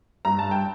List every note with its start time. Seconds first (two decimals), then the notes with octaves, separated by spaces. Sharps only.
0.25 G2 A#5
0.39 A5
0.51 G5